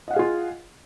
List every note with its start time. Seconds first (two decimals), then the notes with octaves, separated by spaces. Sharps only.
0.08 D#5
0.11 F#5
0.13 F5
0.16 G#4
0.19 F4